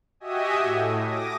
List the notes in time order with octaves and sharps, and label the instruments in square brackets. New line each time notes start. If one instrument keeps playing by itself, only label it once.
[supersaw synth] F#4 G4 D#5 E5 G#5 D#6
A2
D6 D#6 A#6